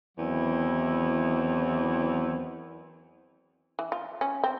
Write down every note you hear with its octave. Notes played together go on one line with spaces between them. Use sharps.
E2 D#3 F#3 C4 E4
E3
F4
C#4
C4